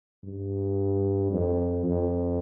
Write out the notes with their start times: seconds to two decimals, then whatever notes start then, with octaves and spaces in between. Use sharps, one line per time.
0.24 G2
1.31 F2
1.85 F2